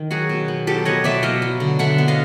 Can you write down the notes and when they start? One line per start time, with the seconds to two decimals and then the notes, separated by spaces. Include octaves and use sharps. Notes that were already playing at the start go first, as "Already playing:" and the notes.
Already playing: D#3
0.11 F#3 F#4 G#4
0.29 B2
0.48 B3
0.67 F#3 G4 A4
0.85 B3 C#5 D#5
1.04 B2 D5 E5
1.23 F#3 D#5 F5
1.42 F#3
1.60 D3
1.79 D3 E5 F#5
1.98 B3
2.08 D#5 F5